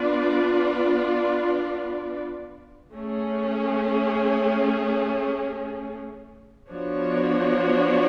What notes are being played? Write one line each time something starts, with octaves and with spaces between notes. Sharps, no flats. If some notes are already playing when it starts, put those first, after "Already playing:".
Already playing: B3 D4 F4 B4 D5
A3 C#4 G#4
F3 B3 D4 F#4 C#5